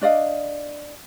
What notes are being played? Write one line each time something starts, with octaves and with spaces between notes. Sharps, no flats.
D4 D5 D#5 F5